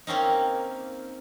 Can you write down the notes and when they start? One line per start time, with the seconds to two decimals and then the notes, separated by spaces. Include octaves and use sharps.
0.07 A#3 C4 C#4 D#4